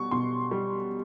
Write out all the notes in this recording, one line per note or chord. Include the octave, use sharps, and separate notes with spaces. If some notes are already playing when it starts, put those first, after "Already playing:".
Already playing: B2 G3 C#6
B2 C6
G3